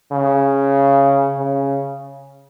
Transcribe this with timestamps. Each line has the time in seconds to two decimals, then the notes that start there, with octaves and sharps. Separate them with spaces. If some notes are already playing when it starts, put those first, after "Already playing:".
0.11 C#3
1.38 C#3